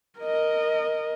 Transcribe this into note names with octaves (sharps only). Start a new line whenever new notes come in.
A#4 D#5